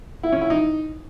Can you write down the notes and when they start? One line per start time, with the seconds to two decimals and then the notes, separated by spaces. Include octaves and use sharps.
0.23 E4
0.32 C#4
0.41 E4
0.50 D#4